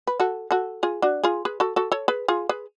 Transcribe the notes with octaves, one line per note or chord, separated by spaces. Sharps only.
B4
F#4 A4
F#4 A4
F4 G#4
D4 F#4
F4 G#4
G#4 B4
F#4 A4
F#4 A4
A4 C#5
G#4 B4
F4 G#4
G#4 B4